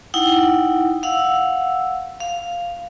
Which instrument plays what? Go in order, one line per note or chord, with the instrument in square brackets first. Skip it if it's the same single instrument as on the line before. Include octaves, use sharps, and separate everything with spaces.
[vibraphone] D#4 E4 F#5 G5
F5 F#5 E6
F5